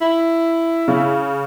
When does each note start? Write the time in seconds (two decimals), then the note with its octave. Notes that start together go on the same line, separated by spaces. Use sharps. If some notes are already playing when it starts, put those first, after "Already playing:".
0.01 E4
0.88 C#3